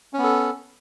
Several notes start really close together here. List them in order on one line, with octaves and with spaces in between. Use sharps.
C#4 B3 A4